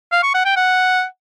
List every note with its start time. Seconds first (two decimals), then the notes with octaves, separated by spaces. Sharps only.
0.12 F5
0.23 C#6
0.34 F#5
0.45 G5
0.56 F#5